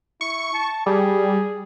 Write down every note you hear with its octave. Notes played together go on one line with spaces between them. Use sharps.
E4 C#6
A5
G3 G#4